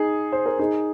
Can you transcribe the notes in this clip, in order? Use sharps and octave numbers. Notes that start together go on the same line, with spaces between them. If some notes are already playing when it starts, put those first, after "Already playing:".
Already playing: D#4 G#4
C5
A#4
D#4 G#4